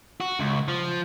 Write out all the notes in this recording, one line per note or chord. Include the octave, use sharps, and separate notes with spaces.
F#4
C#2
F3